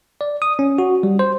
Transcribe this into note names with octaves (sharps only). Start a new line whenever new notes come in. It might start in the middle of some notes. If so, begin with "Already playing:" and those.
D5
D#6
C#4
F#4
G3
C5